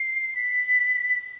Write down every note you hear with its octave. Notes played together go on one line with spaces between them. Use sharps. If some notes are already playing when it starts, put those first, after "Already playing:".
Already playing: C7
B6